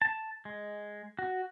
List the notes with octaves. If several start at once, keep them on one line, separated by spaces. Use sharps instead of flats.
A5
G#3
F#4